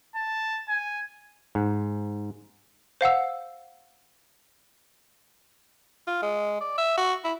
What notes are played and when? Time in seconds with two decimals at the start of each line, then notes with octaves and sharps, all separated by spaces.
0.16 A5
0.69 G#5
1.55 G#2
3.01 C5 F5 F#5 E6
6.07 F4
6.22 G#3
6.61 D5
6.78 E5
6.97 F#4
7.24 E4